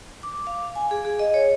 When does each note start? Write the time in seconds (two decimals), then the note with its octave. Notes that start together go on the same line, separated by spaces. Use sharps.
0.23 D6
0.47 F5
0.76 G#5
0.91 G#4
1.05 G#4
1.19 D#5
1.34 C#5